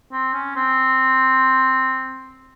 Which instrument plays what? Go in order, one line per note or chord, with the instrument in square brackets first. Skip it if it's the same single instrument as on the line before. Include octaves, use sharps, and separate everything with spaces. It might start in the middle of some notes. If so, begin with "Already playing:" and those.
[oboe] C4
C#4
C4